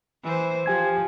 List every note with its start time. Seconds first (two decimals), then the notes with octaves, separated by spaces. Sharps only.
0.24 E3 C5
0.66 F3 G4 G#5 G#6